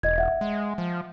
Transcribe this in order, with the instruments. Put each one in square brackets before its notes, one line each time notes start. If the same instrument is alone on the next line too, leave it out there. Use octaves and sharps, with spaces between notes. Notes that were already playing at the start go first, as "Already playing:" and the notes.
[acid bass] E1 [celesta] D#5 G#6
[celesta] E5 F#5
[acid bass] G#3
F3